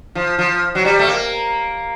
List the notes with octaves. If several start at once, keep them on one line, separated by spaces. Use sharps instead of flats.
F3
F3
F#3
G3
A3
A#3